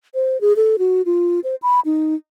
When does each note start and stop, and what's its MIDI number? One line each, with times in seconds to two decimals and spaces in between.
0.15 0.40 72
0.41 0.53 68
0.56 0.76 69
0.79 1.02 66
1.06 1.40 65
1.44 1.55 72
1.62 1.80 83
1.85 2.15 63